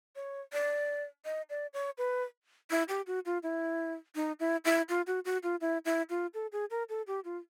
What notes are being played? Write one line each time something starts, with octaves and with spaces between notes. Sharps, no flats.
C#5
D5
D#5
D5
C#5
B4
E4
G4
F#4
F4
E4
D#4
E4
E4
F4
F#4
F#4
F4
E4
E4
F4
A4
G#4
A#4
A4
G4
F4